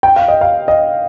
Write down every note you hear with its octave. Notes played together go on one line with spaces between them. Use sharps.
G5
F5
D#5
F5
D#5